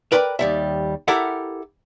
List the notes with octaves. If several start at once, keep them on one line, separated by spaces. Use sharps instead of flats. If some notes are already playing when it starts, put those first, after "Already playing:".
A#4 B4 D5 G5 A#5 B5
D#2 G3 E5
E4 G4 A4 A#4 E5 F#5